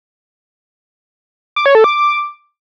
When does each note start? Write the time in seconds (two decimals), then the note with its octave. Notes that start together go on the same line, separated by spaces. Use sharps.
1.56 D6
1.66 C#5
1.75 A4
1.84 D6